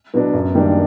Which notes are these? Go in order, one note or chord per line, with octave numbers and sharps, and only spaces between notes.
B2 F#3 B3 D4
F#2
D#3 G3 A#3 D4